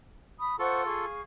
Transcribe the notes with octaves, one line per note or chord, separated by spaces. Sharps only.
B5 D#6
F4 A4 C5 F#5 C#6
G#4 F5 C#6